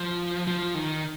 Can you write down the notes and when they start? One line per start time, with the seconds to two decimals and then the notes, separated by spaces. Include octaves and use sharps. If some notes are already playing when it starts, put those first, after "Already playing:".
Already playing: F3
0.47 F3
0.75 D#3